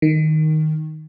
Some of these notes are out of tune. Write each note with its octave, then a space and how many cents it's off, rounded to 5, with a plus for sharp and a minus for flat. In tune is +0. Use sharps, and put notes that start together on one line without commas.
D#3 +0